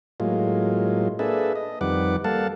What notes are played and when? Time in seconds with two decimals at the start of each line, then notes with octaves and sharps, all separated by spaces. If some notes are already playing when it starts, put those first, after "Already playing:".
0.20 A2 F#3 G#3 A#3 F4
1.19 A#3 D4 G#4 A4 B4 E5
1.55 D#5
1.81 F2 D#3 G3 B4 F#5 D6
2.24 G3 A#3 A4 F5 F#5 A5